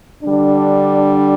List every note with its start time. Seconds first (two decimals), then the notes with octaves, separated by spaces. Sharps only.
0.23 D3 G3 D4